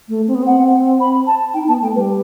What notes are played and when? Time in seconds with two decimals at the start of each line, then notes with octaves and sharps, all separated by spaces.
0.09 A3
0.28 C4
0.35 B3
0.43 C4 F#5
1.00 B5
1.26 A5
1.54 D#4 G5
1.68 B3 A5
1.82 A3 G5
1.95 G3 B4